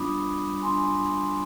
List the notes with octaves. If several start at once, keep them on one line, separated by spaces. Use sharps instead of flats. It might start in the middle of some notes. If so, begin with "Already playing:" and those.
Already playing: G3 B3 D4 F4 B5 D6 D#6
F4
G3
D4 G#5 C6